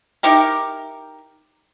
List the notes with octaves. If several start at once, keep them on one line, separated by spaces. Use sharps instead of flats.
D#4 E4 G4 A#4